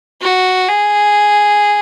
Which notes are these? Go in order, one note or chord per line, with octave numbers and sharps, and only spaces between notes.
F#4
G#4